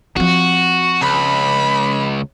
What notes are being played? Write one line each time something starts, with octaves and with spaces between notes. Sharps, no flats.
F3 C4 F#4
C#2 B5